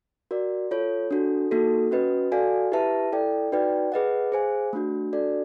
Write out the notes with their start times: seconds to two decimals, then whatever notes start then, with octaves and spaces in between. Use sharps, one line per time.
0.31 F#4 A#4 D5
0.71 F4 A4 C#5
1.11 D4 F#4 A4
1.51 A#3 D#4 F#4 A4
1.91 C#4 F#4 B4 D#5
2.32 F#4 A4 D5 F5 G#5
2.72 E4 G4 B4 E5 A5
3.13 E4 A4 D5 G5
3.52 D#4 F#4 B4 D5 G5
3.92 G#4 B4 D#5 F#5
4.32 G#4 C5 F5 G#5
4.73 A3 D4 F#4
5.13 D4 F#4 A4 D5